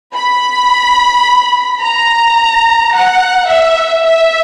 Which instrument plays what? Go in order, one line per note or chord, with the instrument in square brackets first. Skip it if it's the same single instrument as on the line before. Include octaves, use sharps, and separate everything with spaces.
[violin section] B5
A#5
F#5
E5
E5